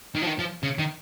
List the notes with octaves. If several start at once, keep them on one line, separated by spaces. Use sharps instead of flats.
D#3
F3
D#3
F3
C#3
D#3